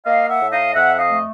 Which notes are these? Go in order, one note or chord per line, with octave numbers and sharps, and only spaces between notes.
A#3 D#5 F5
E5 F#5
A2
D#5 F5
F2 E5 F#5
D#5 F5
A3